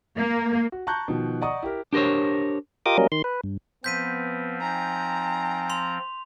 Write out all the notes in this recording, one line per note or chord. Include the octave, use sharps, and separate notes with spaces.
A#3
F#4
A5 A#5 C#6 F#6 G6
B2 D#3 F3
D5 D#5 F#5 A#5 C#6 D#6
E4 G4 A#4
D4 G4 A#4 C5 C#5
F4 G4 A#4 D#5 D6 D#6
F#3 G3 A#3 C#4 A#4 D#5
D#3 C6
B4
G2
F3 B3 C4 G6 B6 D#7
D#4 G5 G#5 A#5
C6 F7